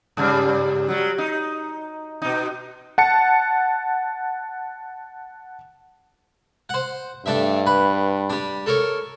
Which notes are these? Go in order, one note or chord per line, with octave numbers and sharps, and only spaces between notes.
G2 C#3 G3
F#3 G3
D#4
B2 D#4
F#5 A5 C#7
C5 F#5
G2 A3 D4 E5
B4
G3 D4
A4 A#4 C#5